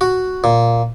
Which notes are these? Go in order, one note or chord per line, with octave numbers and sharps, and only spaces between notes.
F#4
A#2